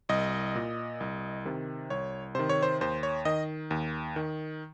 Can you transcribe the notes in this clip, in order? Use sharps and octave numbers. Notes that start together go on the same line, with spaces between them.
C2 D#5
A#2
C2
C3 D#3
C2 C#5
C3 D#3 C5
C#5
C5
D#2 C5
C#5
D#3 D#5
D#2
D#3